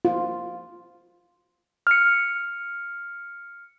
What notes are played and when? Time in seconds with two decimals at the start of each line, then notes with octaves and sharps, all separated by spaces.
0.05 F4
1.87 F6 C#7